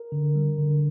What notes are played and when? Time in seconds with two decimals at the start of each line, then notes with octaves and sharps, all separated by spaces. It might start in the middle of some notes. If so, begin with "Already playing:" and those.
Already playing: A#4
0.12 D3
0.35 G3
0.59 D3